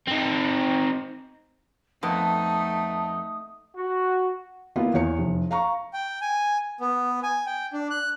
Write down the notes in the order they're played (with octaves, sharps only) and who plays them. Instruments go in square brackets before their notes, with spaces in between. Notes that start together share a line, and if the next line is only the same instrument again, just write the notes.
[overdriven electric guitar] C4 D#4
[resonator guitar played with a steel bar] F2 B3 [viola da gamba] A3 D#4 [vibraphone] A5 [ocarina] D#6
[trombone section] F#4
[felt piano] A#3 B3 E4 F4
E2 C#5 C#7
F1
F5 A#5 C#6
[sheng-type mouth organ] G5
G#5
B3
G#5
G5
D4
F#6